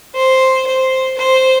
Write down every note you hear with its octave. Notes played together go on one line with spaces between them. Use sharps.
C5
C5
C5